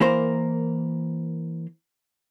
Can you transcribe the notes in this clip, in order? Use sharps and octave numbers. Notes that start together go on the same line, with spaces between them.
E3 A#3 A#4 C5